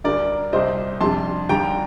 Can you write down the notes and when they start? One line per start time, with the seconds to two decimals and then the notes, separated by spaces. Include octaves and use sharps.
0.04 D2 D3 G3 A#4 D5
0.53 C2 C3 G3 C5 D#5
1.01 F2 C3 G3 D4 A5 C6
1.49 D#2 D3 G3 G5 A#5